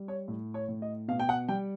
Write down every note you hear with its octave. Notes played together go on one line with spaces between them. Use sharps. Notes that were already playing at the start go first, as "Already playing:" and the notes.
Already playing: G3
C#5
A2
C#5
A2
D#5
B2 F5
G5
F#5
G3 G5